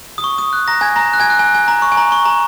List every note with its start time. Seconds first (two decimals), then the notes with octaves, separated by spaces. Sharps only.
0.18 D#6
0.24 C#6
0.38 D#6
0.53 F#6
0.68 A#5 A#6
0.81 G#5 G#6
0.96 A#5 A#6
1.13 F#6
1.20 G#5 G#6
1.30 F#6
1.39 G#5
1.55 G#5
1.68 A#5
1.82 C#6
1.92 G#5
1.97 A#5
2.12 C#6
2.25 A#5